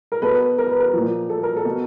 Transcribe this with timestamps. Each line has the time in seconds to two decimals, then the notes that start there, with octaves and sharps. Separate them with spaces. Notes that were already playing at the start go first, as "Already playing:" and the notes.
0.12 A#4
0.22 B2 A4 B4
0.58 A#4
0.69 B4
0.80 A#4
0.93 A#2 F3
1.30 A4
1.43 A#4
1.57 A4
1.65 B2